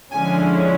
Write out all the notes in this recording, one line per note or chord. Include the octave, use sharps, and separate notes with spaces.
D3 F3 G#3 C#4 E4 G#5